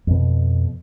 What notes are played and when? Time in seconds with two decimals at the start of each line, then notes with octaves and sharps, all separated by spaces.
0.07 F2 B2